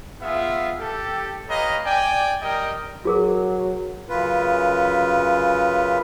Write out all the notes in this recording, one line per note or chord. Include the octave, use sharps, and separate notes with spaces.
B3 F4 G#4 E5
G4 A4
G4 B4 C#5 D#5 F5 A#5
D5 G5 G#5
G3 A#4 D#5 G5
F#3 F#4 G#4 A#4
F#2 C#3 F4 B4